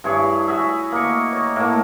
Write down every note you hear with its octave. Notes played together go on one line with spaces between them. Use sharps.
G2 E4 G#4 C#5
F#4 G#4 E5
A#3 D#5 C#6
C#5 D#5
A2 A#3